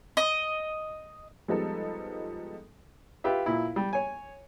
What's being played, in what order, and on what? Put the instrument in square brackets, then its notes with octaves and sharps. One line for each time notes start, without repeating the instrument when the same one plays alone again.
[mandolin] D#5
[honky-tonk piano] F3 G3 G#3 B3 D#4 A4
[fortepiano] F4 G4 B4 E5
A#2 E4
G3
C#5 G#5